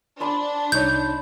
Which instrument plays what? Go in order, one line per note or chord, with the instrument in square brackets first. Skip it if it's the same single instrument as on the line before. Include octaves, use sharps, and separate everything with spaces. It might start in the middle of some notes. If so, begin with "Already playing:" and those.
[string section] D4 [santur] C5 A5 B5
[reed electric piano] C2 D#4 C#5 [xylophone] G6